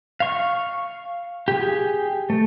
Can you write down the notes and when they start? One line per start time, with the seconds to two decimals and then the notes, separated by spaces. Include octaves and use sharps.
0.20 F5 C#6
1.48 G4 G#4
2.30 A3